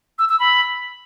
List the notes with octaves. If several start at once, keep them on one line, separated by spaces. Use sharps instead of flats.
E6
E6
B5